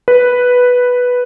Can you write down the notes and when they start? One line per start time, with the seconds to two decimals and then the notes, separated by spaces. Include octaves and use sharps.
0.08 B4